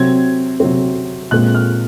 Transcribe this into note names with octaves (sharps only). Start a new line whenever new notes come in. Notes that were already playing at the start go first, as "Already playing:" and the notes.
Already playing: C3 F#3 C4 G#6
C3 F#3 C4
A#2 G#3 C4 F#6
F6